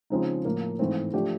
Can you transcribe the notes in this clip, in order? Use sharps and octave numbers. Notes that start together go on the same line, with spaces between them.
C#3 F3 G#3 C4 D#4
A2 F3 A#3
G#2 E3 A3 C4
F3 A3 D4 G4